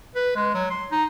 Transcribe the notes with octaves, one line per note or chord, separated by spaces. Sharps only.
B4
G#3
F#3
C6
D#4